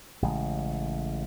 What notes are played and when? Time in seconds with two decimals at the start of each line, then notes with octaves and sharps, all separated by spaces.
0.22 A1 C#3 G#3